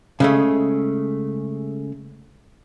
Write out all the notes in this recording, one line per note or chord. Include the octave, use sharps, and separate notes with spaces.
C#3 G#3 A3